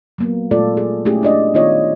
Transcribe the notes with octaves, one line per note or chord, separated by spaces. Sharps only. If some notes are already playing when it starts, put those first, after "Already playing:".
F#3 A#3 B3
A#2 G#3 A3 F4 A4 D5
G#4
A3 C#4 E4 G4 G#4
G#3 D4 D5 D#5
D#3 B3 D#4 F4 C#5 D#5